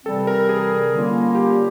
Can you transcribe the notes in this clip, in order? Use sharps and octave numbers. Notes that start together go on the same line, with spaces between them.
C3 E3 G3 C4 A4
A#4
G#4
D3 G3 A#3 C#4 F4
G4